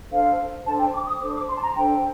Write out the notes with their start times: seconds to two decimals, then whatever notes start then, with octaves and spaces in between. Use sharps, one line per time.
0.11 D4 A4 C5 F5
0.65 D4 A4 C5 A5
0.79 G5
0.93 D6
1.06 D#6
1.20 D4 A4 C5 D6
1.34 D6
1.48 C6
1.56 A5
1.61 A#5
1.75 D4 A4 C5 G5